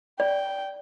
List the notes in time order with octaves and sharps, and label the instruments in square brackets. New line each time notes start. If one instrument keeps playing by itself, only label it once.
[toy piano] D5 [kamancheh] G5